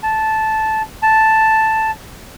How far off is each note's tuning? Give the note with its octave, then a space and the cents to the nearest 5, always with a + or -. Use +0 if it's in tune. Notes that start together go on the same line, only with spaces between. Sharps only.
A5 -10
A5 +0